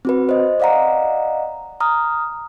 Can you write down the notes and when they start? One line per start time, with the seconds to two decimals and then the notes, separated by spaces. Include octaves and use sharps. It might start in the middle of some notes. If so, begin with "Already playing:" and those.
0.05 C4 F#4 B4
0.29 C5 D#5
0.60 D5 D#5 F5 F#5 A#5
1.80 A#5 D#6 F6